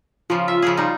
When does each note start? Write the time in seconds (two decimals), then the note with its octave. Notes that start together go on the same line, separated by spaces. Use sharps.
0.30 C#3 F3 F4
0.48 E5
0.62 C#3 F3 G#4
0.77 G3 D#4